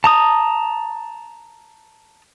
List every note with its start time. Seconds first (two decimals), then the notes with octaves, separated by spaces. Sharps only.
0.04 A5 A#5 D#6